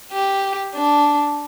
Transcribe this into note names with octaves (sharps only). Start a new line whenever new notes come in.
G4
D4